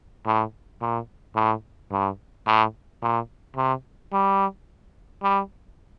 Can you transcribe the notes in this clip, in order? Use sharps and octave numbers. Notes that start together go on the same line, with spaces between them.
A2
A#2
A2
G2
A2
A#2
C3
G3
G3